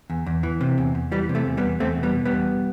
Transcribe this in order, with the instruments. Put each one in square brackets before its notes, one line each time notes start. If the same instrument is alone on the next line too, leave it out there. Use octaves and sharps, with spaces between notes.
[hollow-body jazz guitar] E2
E2
E3
C3
E2
E2
E3 G3
C3
A3
E2
G3 B3
E2
E2 A3 C4
B2
G3 B3
B2
G3 B3
E2